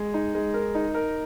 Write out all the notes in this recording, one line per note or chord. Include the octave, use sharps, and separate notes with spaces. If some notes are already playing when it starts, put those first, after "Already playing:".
Already playing: G#3
D#4
G#3
A#4
D#4
A#4